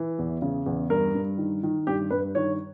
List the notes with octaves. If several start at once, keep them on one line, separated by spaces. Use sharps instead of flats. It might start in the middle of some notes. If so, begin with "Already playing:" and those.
Already playing: E3
E2
C#3
E2
G2 A#4
G2
D#3
D#3
G2 G4
G2 B4
D#3 C#5